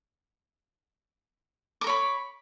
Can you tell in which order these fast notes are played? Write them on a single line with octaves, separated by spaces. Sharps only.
D6 A#4 C#5 B5